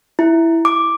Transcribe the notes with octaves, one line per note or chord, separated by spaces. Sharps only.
E4
D6